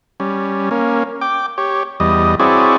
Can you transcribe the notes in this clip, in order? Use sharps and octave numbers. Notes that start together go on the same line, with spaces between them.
G3 C#4
A#3 C#4
G5 D6
G4 C#5
E2 G3 D#5
C4 E4 F#4 G#4 C#5 D5